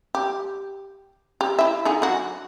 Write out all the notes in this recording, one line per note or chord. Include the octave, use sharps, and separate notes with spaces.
G4
G4
E4 E5
D3 D#4 G#4
F#3 F#4